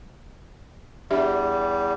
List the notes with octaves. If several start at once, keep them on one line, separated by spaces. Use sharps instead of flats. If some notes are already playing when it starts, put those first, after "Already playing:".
E2 G3 D4 G4 E5